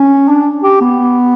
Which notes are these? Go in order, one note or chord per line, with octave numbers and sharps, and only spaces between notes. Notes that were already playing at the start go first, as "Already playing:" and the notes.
Already playing: C#4
D4
G4
B3